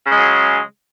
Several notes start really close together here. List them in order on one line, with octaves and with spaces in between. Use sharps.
C#3 G#3 F#3